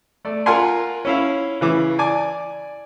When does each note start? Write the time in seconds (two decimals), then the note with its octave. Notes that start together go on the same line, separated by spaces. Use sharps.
0.25 A3 D5
0.46 F4 A#4 F5 F#5 G#5 C6
1.05 C#4 E4 F5
1.61 C#3 E3 D6
1.99 D5 G#5 D6